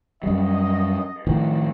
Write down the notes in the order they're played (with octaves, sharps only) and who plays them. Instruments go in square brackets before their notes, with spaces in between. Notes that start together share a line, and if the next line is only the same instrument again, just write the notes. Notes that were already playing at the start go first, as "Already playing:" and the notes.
[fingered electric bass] F#2 G3 [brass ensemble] D#5
[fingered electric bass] A2 D#3 F3